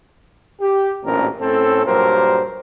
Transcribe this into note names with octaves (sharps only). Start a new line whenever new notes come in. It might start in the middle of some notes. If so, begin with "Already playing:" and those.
G4
A1 F#2 A#2 C4 D4 A#4
A2 C4 C#4 A4
G2 A#2 F#3 G4 A#4 C5